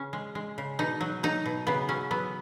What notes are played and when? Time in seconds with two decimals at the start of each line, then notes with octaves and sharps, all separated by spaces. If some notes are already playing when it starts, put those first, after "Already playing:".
Already playing: C#3 C#4
0.13 G#3
0.35 G#3
0.58 C#3
0.79 B2 D#4
1.01 F#3
1.23 F#3 D#4
1.46 B2
1.67 C#3 B3
1.88 F#3 C#4
2.11 F#3 B3